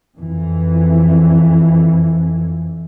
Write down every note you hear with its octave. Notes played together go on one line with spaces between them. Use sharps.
F2 E3